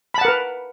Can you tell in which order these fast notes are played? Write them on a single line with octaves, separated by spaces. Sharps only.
B5 A5 F#5 A#4 B4